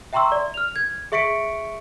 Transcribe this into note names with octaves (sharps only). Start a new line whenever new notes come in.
E5 G5 A#5 C6 C#6 E6
D5
F6 F7
G#6
G#4 E5 C#6 B6 C#7 D7